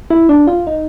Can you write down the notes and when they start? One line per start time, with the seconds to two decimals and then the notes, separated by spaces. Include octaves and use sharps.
0.10 E4
0.29 D4
0.47 F4
0.67 D#4